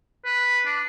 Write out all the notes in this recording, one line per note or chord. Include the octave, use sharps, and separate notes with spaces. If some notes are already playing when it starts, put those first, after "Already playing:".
B4
D4